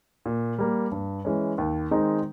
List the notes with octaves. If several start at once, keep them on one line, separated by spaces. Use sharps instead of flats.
A#2
G3 A#3
G2
E3 G#3 C#4
D#2
D#3 G#3 C4 D#4